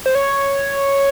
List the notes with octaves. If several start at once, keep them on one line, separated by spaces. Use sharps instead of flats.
C5
C#5